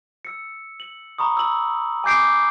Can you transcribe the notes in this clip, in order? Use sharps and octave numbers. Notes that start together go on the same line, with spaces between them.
E6 C#7
F#7
A#5 B5 C#6 D#6
E6 F#7
G#5 D6 G6 C7 D7